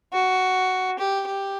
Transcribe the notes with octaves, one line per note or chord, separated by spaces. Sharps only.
F#4
G4
G4